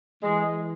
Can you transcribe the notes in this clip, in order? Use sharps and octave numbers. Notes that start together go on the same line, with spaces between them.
E3 G#3